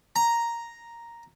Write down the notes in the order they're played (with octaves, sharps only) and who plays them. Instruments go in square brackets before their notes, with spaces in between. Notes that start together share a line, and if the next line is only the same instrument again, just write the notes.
[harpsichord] A#5